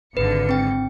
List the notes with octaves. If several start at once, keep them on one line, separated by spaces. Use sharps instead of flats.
G#1 D3 B4 C#7
C4 G5